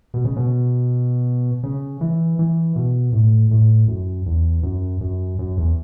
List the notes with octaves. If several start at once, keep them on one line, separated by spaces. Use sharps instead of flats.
B2
C#3
B2
C#3
E3
E3
B2
A2
A2
F#2
E2
F#2
F#2
F#2
E2